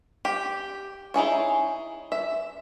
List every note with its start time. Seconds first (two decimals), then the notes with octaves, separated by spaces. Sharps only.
0.25 G4
1.14 D#4 E4 G#4 C#5
2.12 E5